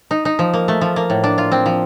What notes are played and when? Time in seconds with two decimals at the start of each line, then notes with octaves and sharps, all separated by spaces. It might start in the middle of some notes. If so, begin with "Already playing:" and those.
0.11 D#4
0.25 D#4
0.39 F3
0.53 A#3
0.68 A3
0.81 F3
0.96 A#3
1.10 A2
1.24 D4
1.38 F4
1.52 C4
1.66 F3